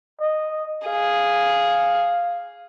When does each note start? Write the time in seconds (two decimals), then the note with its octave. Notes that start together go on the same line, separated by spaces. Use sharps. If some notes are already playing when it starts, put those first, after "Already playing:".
0.20 D#5
0.87 G#4 F5